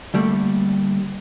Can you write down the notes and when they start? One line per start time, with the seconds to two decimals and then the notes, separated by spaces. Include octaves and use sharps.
0.14 D3 G3 A3 A#3